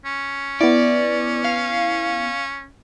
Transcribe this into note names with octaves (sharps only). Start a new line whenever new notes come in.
C#4
B3 E4 D5
F5